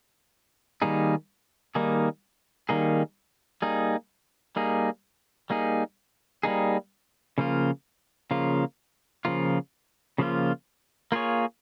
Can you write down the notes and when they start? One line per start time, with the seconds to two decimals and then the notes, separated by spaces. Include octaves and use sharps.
0.82 D#3 G3 A#3 D#4 G#4
1.75 D#3 G3 A#3 D#4 G#4
2.69 D#3 G3 A#3 D#4 G#4
3.62 G3 A#3 D#4 G#4
4.56 G3 A#3 D#4 G#4
5.50 G3 A#3 D#4 G#4
6.43 G3 A#3 D#4 G#4
7.38 C#3 F3 A#3 F4
8.31 C#3 F3 A#3 F4
9.25 C#3 F3 A#3 F4
10.18 C#3 F3 A#3 F4
11.12 A#3 F4 G#4 C#5